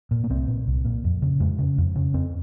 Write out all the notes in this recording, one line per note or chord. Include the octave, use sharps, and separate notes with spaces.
A#2
A#3
C2 C4
A#2
C2
A#2
F2
C#3
F2 G#3
C#3
F2
C#3
F2 C4